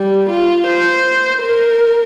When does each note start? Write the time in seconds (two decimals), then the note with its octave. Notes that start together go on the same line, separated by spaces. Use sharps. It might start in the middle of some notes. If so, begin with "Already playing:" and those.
Already playing: G3
0.30 F4
0.67 C5
1.42 A#4